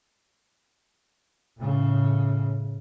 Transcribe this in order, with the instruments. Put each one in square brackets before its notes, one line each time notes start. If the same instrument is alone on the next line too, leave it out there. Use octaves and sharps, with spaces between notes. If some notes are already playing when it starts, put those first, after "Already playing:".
[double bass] A2 C#3